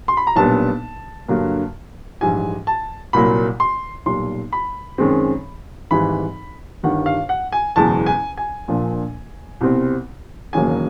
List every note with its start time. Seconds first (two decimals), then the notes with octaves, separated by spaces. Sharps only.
0.08 C6
0.17 B5
0.27 A#5
0.36 B1 A#2 G3 B3 D4 A5
1.28 G2 D3 F#3 A#3
2.21 A#1 G#2 E3 G3 G#5
2.67 A5
3.13 C2 A#2 F#3 A#3 B5
3.60 C6
4.06 B1 A#2 G3 C6
4.53 B5
4.98 F#2 D#3 G#3 C4
5.91 G#1 G#2 E3 G3 B5
6.83 G1 G2 D#3 G3 F#5
7.06 F5
7.29 F#5
7.52 G#5
7.76 F#1 E2 B2 G#3 A5
8.06 G#5
8.37 G#5
8.68 A#1 A#2 F3 A#3 D4
9.61 C2 B2 G3 C4
10.53 E1 D#2 C#3 F#3 A#3 G#5